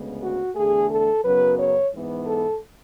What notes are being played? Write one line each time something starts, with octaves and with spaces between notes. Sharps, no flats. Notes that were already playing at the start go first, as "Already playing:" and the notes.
Already playing: D2 C#3 G#3 B3
F#4
E2 D3 A3 G#4
A4
F#2 C#3 F#3 B3 B4
C#5
G#2 E3 B3
A4